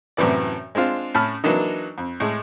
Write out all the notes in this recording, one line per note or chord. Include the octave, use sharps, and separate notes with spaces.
F#2 A2 C3 E3 D5
G#3 C4 D4 F4
A2 C#4 A5 B5 F6
E3 F#3 A#3 D4 D#4
F2
A2 G#3